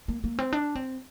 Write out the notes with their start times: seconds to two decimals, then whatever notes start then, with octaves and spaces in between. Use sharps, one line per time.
0.08 A#3
0.24 A#3
0.39 C4
0.53 D4
0.75 C4